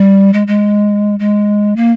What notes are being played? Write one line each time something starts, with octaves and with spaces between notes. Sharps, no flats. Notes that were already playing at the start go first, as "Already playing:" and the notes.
Already playing: G3
G#3
G#3
G#3
A#3